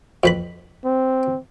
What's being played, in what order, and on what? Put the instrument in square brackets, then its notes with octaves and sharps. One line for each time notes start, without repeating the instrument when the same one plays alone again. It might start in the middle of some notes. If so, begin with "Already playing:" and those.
[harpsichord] F2 B4 B5
[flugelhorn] C4